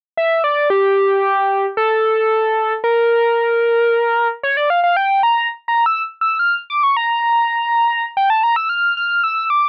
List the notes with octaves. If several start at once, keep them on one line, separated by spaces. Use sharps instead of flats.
E5
D5
G4
A4
A#4
C#5
D5
F5
F5
G5
A#5
A#5
E6
E6
F6
D6
C#6
A#5
G5
A5
A#5
E6
F6
F6
E6
D6